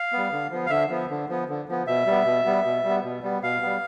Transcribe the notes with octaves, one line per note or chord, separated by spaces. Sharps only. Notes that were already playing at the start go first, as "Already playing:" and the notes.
Already playing: F5
G3 B3
D3
F3 B3
F5
D3 E5
F3 B3
D3
F3 B3
D3
F3 B3
B2 E5
G3 B3
B2
G3 B3
B2
G3
B3
B2
G3 B3
B2 F5
G3 B3